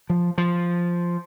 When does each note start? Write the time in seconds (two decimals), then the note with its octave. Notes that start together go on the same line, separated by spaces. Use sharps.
0.10 F3
0.38 F3